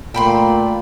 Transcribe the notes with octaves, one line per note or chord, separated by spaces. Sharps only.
A#2 A3 G5 B5 C6